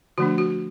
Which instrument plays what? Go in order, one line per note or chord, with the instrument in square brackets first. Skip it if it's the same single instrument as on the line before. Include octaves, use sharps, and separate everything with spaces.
[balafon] D3 F3 A3 D4 F#4
F#4